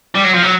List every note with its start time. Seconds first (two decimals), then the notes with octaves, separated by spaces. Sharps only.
0.15 G3
0.24 F#3
0.34 F3
0.43 F#3